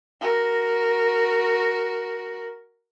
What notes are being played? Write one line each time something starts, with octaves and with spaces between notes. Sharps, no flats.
F#4 A#4